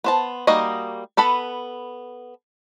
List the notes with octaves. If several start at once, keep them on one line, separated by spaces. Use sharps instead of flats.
B3 C5 A5
G3 A#3 D#4 F#4 D#5
B3 A4 B4 B5